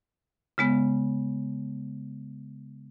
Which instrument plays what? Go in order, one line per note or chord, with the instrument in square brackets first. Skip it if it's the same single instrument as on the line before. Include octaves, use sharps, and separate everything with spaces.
[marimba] C#3 G#3 B3